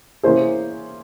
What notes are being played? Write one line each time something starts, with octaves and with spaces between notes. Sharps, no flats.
E3 A#3 C#4 E4 G#4 C5